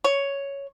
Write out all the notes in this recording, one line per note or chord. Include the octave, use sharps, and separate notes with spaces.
C#5